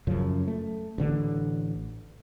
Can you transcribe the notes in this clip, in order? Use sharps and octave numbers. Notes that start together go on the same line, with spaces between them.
F#2 C#3 F3
A3
A1 D3 A3 D4